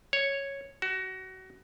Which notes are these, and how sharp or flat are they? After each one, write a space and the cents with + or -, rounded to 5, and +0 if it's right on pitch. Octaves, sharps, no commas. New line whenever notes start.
C#5 -5
F#4 +25